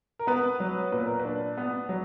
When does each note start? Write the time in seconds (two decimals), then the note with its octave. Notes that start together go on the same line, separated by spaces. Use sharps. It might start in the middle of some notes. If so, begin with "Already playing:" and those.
0.19 A#4
0.27 B3 B4
0.60 F#3
0.92 A#2 B4
1.06 A#4
1.20 B4
1.25 D4
1.57 B3
1.89 F#3